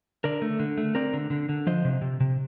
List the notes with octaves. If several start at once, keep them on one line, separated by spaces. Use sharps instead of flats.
D3 A#4 D5
A3
D3
A3
C4 A#4 D5
D3
D3
D3
F3 C5 D#5
C3
C3
C3